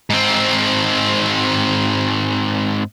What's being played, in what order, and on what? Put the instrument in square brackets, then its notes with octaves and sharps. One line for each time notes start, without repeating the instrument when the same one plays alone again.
[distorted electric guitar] G#2 C4